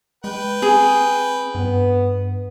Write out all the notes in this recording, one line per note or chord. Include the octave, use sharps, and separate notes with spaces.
G#3 B4 G5
C4 G#4
G2 B3